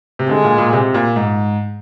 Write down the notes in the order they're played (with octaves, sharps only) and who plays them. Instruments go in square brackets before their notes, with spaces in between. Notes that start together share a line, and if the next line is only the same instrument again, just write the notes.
[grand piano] C3
[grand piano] D3 [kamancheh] G#3
[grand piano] A#2
A#2
C3
A#2
G#2